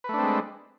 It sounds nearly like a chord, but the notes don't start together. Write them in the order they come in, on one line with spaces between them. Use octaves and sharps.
B4 A3 D4 C4 G#3